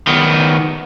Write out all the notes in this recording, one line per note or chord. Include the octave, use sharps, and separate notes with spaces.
D#3 B3